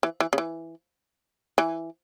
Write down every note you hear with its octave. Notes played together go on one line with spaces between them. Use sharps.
E3
E3
C#3
E3
E3